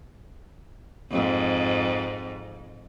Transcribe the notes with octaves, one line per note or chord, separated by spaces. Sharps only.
F2 G#2